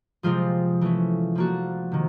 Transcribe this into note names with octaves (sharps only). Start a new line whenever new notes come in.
C3 F3 G#3 C4 F4
E3 A3 C#4
F3 A#3 D4 F#4
C3 D#3